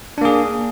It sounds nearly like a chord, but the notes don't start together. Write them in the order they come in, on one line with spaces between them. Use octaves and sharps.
D4 A#3 G#4